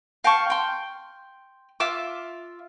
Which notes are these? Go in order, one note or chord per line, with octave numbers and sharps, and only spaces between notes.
F5 G5 A5 C#6
G5 C6
F4 E5 D6